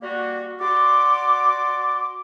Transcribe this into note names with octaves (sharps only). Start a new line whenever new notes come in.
G3 A#3 F#4
F#4 D5 C6 D6